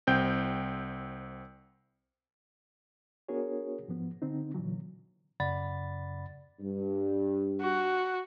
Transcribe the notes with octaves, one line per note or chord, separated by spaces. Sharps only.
C2 C4 G5 G6
B3 D4 F#4 G#4 A#4 C#5
G#2 F3 B3
D3 C4 D#4
A#2 D3 E3 F#3
F#2 C#3 D5 F#5 B5 A6
G2
F#4